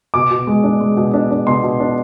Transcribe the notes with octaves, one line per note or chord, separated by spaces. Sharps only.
B2 D6
B2
G#3
D4
G#3
B2
D4
D4
B2 C6
B2
D4